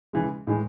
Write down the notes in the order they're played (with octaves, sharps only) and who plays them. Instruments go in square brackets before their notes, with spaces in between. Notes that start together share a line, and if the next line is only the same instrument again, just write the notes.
[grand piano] C#3 E3 G#3
A2 E3 G#3